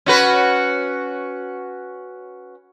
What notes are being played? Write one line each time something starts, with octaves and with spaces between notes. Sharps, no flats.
C#4 F#4 B4